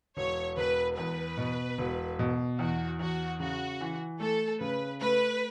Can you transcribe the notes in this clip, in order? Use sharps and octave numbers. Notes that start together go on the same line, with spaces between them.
E1 C#5
E1 B4
E2 B4
B2
E1
B2
E2 F#4
E2 F#4
C#3 F#4
E3
A3 A4
C#3 B4
A3 B4